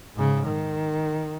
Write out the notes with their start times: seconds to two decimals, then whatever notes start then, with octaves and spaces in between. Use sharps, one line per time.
0.15 G#2 C#3
0.47 D#3